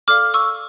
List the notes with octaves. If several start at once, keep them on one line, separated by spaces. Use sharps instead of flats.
A4 D5 F5 D6 F6
C#6 E6